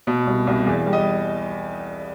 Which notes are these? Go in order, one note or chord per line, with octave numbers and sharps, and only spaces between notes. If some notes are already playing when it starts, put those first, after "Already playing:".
B2
C2
C2
E2
G3
D#5